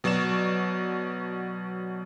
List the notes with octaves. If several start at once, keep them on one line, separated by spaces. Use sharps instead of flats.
B2 F#3 F#4 D5 E7